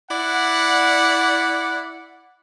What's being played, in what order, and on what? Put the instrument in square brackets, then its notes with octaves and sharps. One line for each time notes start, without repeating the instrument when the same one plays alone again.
[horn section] E4 D5 F#5